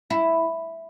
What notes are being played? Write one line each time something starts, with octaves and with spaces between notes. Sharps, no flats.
E4